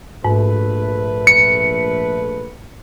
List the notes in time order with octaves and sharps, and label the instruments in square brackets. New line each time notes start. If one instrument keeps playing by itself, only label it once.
[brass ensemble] A#1 A3 B4 [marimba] G#2
[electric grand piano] C#7